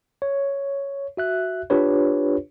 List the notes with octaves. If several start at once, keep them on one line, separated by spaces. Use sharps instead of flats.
C#5
F#4 E5 F#6
D4 F4 G4 B4 C#5